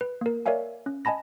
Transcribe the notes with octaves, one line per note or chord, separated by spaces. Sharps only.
B4
A#3 A#4
A#4 C#5 D5 E5 F5 G#5
C#4
D#5 G#5 A5 B5 A#6